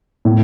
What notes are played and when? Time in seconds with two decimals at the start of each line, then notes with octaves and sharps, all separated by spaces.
0.25 A2